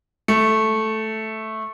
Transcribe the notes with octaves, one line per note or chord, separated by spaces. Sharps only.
A3